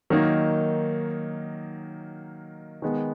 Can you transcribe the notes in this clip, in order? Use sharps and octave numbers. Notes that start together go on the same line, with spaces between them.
D#3 F#3 A#3 D#4
D#3 G#3 B3